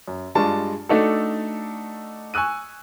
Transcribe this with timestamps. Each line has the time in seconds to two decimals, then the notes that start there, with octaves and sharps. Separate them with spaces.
0.08 F#2
0.35 G2 G#3 D4 F4 A5 C#6
0.89 A3 D4 D#4 F#4 A4
2.34 G#5 C#6 E6 F#6 D#7